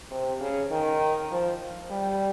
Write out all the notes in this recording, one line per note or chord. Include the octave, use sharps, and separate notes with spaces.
C3
C#3
D#3
F3
G3